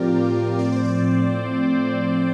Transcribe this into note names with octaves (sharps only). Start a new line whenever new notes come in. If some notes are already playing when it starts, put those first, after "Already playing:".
Already playing: A2 F3 C4 F4 G4 A#4 D5
F3
C4 D5
C5
D5
A2
A2
A2